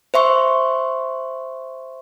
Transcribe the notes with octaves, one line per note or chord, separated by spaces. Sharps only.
C5 E5 C6 C#6